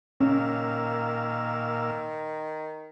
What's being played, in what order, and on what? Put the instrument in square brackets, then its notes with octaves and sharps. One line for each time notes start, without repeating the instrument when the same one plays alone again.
[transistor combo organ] A#2 F5 E6 [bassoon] D#3 [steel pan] C#4